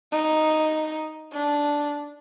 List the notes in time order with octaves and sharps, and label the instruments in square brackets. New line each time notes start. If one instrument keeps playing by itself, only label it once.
[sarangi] D#4
D4